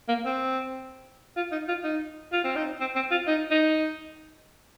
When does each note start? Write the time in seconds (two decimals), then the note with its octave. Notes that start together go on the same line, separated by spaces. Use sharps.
0.08 A#3
0.25 C4
1.36 F4
1.52 D#4
1.68 F4
1.84 D#4
2.32 F4
2.44 C4
2.56 D#4
2.80 C4
2.95 C4
3.11 F4
3.27 D#4
3.51 D#4